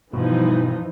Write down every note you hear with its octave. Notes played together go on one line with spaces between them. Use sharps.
G2 B2 E3 F3 D#4